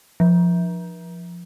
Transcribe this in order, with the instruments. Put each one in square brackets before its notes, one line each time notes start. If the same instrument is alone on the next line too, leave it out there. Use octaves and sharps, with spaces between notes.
[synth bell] F3